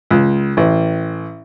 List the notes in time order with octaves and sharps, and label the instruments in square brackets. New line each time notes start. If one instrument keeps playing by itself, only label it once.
[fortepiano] C#2
A1